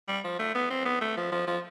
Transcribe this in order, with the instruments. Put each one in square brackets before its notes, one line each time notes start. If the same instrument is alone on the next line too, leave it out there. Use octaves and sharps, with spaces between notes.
[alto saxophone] G3
F3
A3
B3
C4
B3
A3
F3
F3
F3